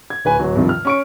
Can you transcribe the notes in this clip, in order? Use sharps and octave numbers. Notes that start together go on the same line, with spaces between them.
G#6
D1 B4 G#5
D1 F#3
G2 C3 D#3 F3
F6
C#4 C#6 D7